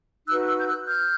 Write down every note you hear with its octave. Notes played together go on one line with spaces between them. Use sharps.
D#4 F#4 B4 E6 F#6
E6 F#6
G6
E6 F#6
F6 G6